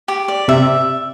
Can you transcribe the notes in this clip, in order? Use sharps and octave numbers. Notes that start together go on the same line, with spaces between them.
G4
D5
C3 E5